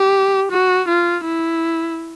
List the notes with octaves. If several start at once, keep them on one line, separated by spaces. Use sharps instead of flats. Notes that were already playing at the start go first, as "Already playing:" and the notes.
Already playing: G4
F#4
F4
E4